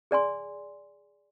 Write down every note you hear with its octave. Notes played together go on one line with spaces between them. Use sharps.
G#4 D5 G#5 C6